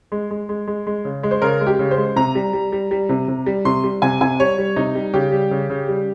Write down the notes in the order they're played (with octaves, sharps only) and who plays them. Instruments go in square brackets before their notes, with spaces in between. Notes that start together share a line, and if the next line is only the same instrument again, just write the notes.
[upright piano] G#3
G#3
G#3
G#3
G#3
C#3
G#3
C5
C#3 A#4
G#3
G4
C#3
C5
G#3
C3 A#5
G3
G3
G3
G3
C3
C3
G3
C3 C6
G3
C3 G#5
C3 G#5
G3 C#5
G3
C3 D#4
G3
C#3 G4
G3
C#3
C#3
G3